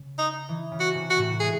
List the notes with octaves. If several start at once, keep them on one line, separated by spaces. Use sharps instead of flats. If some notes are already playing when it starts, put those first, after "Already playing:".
Already playing: C#3
D#4
E3
C#3
F#4
C3
F#4
A2
G#3 G#4